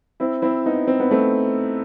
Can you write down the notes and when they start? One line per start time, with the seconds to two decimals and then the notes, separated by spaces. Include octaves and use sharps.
0.20 C4 E4
0.42 C4 E4
0.66 B3 D#4
0.87 C4
1.00 B3
1.11 A3 C4